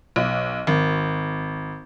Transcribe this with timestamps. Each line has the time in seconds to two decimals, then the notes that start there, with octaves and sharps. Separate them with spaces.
0.16 B1
0.67 G#1